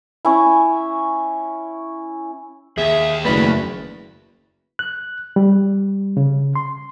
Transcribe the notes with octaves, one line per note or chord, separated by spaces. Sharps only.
C#4 E4
D#2 G#4 E5
F#1 A3 B4 D5 E5
F#6
G3
C#3
C6